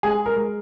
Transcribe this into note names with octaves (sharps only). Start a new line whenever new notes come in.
G#3 G#4
A#4
G#3